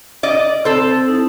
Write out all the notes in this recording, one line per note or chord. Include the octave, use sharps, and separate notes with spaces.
D5 D#5
C4 A4 C5
D#4 E4 A5